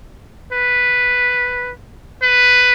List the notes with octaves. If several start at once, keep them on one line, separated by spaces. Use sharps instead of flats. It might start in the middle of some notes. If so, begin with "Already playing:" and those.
B4
B4